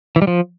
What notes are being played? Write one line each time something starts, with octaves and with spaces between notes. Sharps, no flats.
E3
G3
F3